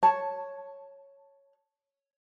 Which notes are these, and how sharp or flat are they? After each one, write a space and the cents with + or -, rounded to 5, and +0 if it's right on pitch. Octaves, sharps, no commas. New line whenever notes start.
C#5 +0 A5 +0